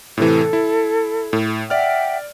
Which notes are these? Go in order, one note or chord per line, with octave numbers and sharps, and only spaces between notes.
A2 C3 E3 A4
E4
A2
D5 E5 F#5 G5 F6